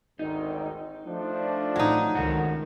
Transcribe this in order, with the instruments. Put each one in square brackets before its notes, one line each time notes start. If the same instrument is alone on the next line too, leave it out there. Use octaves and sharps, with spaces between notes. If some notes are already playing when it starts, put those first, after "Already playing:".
[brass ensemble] G#1 D2 D#3 [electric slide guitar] D#4
[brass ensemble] F3 A3 D4
[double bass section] A1 [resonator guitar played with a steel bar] F#3 D#4
[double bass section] C#2 D#3 [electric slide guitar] G#2 F#4 A4